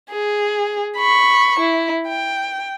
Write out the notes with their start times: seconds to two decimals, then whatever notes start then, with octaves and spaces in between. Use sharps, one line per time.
0.11 G#4
0.98 B5 C#6
1.60 E4
2.08 G5